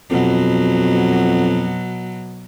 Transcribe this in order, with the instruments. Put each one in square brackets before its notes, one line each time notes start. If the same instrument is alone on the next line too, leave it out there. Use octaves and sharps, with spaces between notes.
[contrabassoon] F2 [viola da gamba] B2 F#3